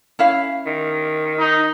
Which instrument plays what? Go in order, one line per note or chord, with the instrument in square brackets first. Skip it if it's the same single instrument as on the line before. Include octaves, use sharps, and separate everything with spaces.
[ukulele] C#4 E4 F5
[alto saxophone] D#3
[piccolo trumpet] D#4